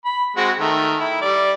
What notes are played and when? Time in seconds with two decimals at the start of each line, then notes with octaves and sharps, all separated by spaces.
0.05 B5
0.37 G#3 C4 F#4
0.60 D#3 A3
1.00 E4
1.22 G3 D5